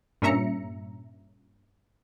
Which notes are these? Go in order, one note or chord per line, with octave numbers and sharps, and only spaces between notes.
G2 A#2 C#4 E5 A#5 C#7